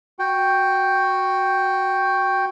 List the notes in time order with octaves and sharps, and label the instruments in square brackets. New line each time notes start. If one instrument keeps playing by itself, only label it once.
[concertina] F#4 G5